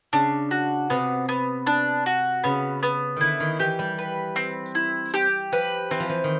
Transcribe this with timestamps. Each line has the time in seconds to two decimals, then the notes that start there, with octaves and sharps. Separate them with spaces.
0.13 C#3 D4
0.51 F#4
0.90 C3 B3
1.29 B3
1.67 D4
2.06 F#4
2.44 C#3 B3
2.83 B3
3.17 D3 D#3 E4
3.40 D#3
3.59 E3 G4
3.79 G3
3.98 B4
4.36 C4
4.75 E4
5.14 G4
5.52 F3 B4
5.91 E3 C4
6.00 F3
6.09 E3
6.24 D#3